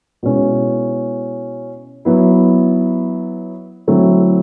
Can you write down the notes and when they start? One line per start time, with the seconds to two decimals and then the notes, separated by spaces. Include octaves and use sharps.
0.23 B2 G#3 C#4 E4
2.05 F#3 B3 E4
3.87 D3 F#3 A3 C4 E4